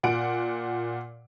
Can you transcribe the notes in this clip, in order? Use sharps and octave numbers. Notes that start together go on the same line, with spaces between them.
A#2 F#5 D7